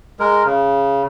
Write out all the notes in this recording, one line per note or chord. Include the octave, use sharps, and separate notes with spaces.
G#3 A#4
C#3